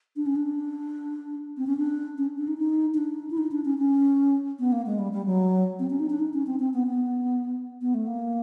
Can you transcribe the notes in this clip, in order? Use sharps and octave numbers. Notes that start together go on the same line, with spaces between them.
D4
C#4
D4
C4
C#4
D4
C#4
D4
D#4
D#4
D#4
D4
E4
D#4
D4
C#4
C#4
B3
A#3
G#3
G3
G3
F#3
C4
C#4
D#4
D4
D#4
C#4
C4
C4
B3
B3
B3
A3
A#3